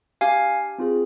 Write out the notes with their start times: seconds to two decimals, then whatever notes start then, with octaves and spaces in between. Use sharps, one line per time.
0.21 D4 G4 F5 G#5
0.78 C4 F4 G#4